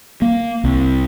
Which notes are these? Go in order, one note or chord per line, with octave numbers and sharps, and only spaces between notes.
A#3
C2